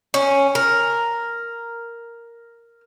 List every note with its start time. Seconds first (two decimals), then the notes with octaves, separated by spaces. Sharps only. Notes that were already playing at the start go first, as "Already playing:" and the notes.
0.14 C#4
0.55 A#4